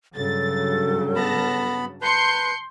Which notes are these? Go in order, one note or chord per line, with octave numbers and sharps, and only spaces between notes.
G2 C#3 F#3 A4 A6
B3 A5 B5 A#6
B4 A5 C6 G6 C#7